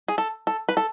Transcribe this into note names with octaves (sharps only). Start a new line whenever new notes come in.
G#4
A4
A4
B4
A4